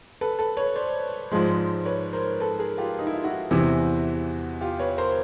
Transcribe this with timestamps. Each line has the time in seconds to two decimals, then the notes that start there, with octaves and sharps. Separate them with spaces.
0.21 A4 B4
0.39 A4 B4
0.57 B4 C#5
0.76 C5 D5
1.31 G#2 F3 G#3
1.85 B4 C#5
2.13 A#4 C5
2.40 A4 B4
2.59 G#4 A#4
2.78 F4 G4
2.99 D#4
3.07 E4
3.15 F4
3.24 E4 F#4
3.51 E2 C3 E3
4.61 F4 G4
4.79 B4 C#5
4.98 A#4 C5